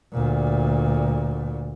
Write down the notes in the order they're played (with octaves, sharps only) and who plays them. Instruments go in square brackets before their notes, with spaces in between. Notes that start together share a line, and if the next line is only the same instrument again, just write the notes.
[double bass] D2 A#2